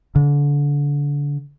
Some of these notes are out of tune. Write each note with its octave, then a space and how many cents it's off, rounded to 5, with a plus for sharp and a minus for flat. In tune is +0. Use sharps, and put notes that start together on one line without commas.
D3 -30